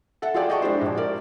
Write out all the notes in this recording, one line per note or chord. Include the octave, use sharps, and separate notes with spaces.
A4 E5 F#5
F4 F#4 G#4 A4 D5 G5
D5 D#5 G5 A5 C#6
G#3 D4 E4 G4 C5
A#1
A#4 D5